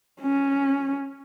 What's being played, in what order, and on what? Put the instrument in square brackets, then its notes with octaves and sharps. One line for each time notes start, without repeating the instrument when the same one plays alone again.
[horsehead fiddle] C#4